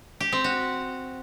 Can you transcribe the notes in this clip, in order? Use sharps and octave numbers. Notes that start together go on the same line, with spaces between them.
G4
C4
F#4